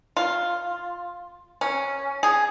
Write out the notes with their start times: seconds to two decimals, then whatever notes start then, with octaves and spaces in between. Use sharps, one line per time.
0.17 F4
1.61 C#4
2.23 G#4